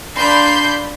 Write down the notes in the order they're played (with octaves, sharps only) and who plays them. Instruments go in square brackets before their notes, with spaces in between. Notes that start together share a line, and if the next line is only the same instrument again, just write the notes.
[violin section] A#3 D4 B5 C6 G6